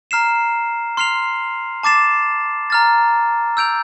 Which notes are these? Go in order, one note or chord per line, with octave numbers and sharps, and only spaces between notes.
A#5 F6 C7 E7
C6 F6 C7 F7
A5 D6 A6 C7 E7
A#5 F6 A6
E6 G6 D7 F7